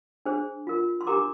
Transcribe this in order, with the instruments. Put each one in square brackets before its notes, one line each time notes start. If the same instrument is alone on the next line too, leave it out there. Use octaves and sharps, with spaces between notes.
[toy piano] D4 G#4 C5
F4 A#4
C6
D4 G4 A#4 A#5 D6